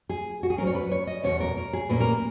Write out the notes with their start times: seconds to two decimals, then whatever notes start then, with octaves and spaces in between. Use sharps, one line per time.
0.09 G#4
0.43 F#4
0.50 G#4
0.58 G#2 F#3 C#4 A#4
0.67 C#5
0.75 B4
0.91 C#5
1.07 D#5
1.23 E2 B2 G#3 C#4 C#5
1.40 A#4
1.57 A#4
1.73 G#4
1.89 A#2 A#3 C#4 B4
2.00 A#4